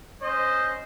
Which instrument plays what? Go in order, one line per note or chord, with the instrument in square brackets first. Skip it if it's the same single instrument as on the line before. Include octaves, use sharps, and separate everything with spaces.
[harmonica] C#4 D#5 D#6 [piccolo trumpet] C5